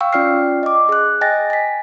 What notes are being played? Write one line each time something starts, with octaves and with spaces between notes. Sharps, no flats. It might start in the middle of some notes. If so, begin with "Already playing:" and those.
F5 G5 C#6 E6
C#4 F4 D5 G5 F6 C7
D#5 D6
G#4 F#6
D#5 G5 G#5 A6 A#6
G#5 B6